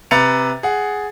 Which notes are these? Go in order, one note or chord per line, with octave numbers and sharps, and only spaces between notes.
C3 B4 A#5 A6 C#7 F7
G#4 F#5